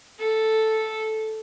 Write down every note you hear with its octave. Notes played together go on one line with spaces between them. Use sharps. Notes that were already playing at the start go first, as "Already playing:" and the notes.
A4